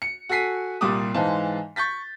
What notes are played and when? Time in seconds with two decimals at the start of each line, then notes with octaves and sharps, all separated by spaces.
0.02 C#7
0.29 F#4 A4 G#5 B6 C7 D#7
0.81 C2 A#2 G3 D6 D#6
1.14 G#2 E3 G#3 C5 F5 A5
1.76 C#6 G6 A6 B6